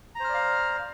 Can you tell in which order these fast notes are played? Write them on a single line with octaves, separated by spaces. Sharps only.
A#5 C5 F6 D5 F5